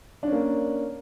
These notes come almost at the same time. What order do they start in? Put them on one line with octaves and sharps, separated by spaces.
D4 C#4 A#3